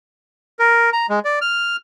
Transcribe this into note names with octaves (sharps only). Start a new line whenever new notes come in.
A#4
A#5
G#3
D5
F6